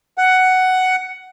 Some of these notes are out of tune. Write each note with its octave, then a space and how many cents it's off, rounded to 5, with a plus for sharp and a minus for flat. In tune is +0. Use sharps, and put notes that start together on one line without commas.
F#5 +10